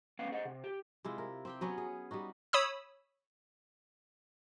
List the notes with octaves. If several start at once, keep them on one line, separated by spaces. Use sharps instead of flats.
B3 C#4 B4 F5 F#5
G#4 D#5 F#5
C3
G4
C3 G#3 E4 F4
A#4
C4 G4 G5
F#3 B3 C#4 C#5
G#4
G3 B3 D#4 F#4
C#5 B5 D#6 E6